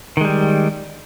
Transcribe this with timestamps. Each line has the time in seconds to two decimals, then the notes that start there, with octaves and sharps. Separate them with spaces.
0.17 D#3
0.21 G#3
0.25 G3